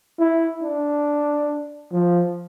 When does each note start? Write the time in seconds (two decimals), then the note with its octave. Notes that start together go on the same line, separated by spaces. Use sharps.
0.19 E4
0.62 D4
1.92 F3